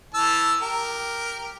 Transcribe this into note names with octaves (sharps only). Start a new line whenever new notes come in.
E3 A5 E6
G4 A#4